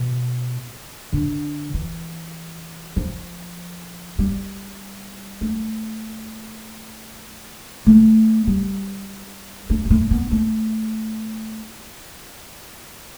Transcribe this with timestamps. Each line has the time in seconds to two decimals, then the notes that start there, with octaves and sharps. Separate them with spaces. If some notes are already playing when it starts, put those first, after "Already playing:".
Already playing: B2
1.13 D3
1.74 E3
2.96 F3
4.19 G3
5.41 A3
7.86 A3
8.47 G3
9.70 A3
9.85 G3
9.90 A3
10.11 B3
10.31 A3